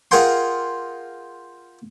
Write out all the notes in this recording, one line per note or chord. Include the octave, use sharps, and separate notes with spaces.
F4 G#4 A#4 F#5 G5 C6